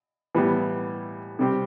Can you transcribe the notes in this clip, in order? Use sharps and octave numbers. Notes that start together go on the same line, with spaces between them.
A2 E3 G3 B3
C3 G3 C4 G4